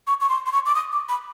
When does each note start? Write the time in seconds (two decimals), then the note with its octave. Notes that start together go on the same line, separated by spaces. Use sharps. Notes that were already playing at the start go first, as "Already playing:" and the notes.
0.07 C#6
0.21 C#6
0.29 C6
0.46 C6
0.52 C#6
0.66 D6
0.75 D#6
0.92 D6
1.09 B5